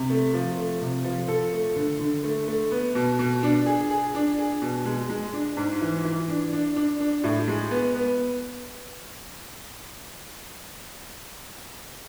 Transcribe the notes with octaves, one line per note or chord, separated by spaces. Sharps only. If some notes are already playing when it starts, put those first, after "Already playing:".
Already playing: C3
A3
F3
A3
C3
F3
A4
A3
D3
D3
A3
A3
B3
B2
B2
D4
G#4
G#4
D4
G#4
B2
G#3
G#3
D4
G#2
E3
E3
D4
D4
D4
D4
A2
G#3
B3
B3